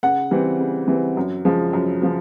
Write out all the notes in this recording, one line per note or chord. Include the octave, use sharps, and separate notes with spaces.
C#3 F#5
E3 G3 C4
C#3
E3 G3 C4
F#2
C#3 F3 G#3
F#2
C#3 F3